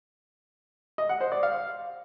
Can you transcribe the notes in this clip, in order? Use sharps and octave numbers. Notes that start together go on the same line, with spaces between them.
D#5
F#5
C5
D5
F5